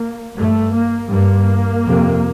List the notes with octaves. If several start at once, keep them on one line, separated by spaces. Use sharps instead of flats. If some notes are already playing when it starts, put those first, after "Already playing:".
Already playing: A#3
G2 A3
A#3
G2 A#3
F2 C3